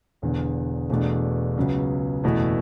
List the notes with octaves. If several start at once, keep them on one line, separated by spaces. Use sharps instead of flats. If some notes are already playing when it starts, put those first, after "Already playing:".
E1 E2 D3
E1 E2 B2 A3 D4
C#2 C#3 F#3 B3
F#1 E2 B2 A3 E4